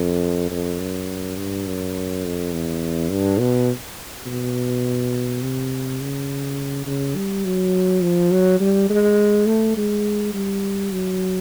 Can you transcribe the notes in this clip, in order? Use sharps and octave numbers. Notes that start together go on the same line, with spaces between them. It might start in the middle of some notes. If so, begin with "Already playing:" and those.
Already playing: F2
F2
F#2
G2
F#2
F2
E2
G2
B2
B2
C3
C#3
C#3
G3
F#3
F3
F#3
G3
G#3
A3
G#3
G3
F#3